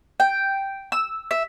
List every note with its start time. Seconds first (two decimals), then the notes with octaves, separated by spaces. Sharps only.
0.20 G5
0.92 E6
1.31 E5